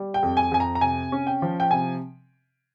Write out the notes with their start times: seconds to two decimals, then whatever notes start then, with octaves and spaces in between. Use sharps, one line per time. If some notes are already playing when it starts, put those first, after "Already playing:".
Already playing: G3
0.14 G5
0.23 F2
0.37 G#5
0.52 F2 G#5
0.60 A#5
0.75 A#5
0.81 C3 G#5
1.12 C#4
1.27 G5
1.42 F3
1.60 G5
1.71 C3 G#5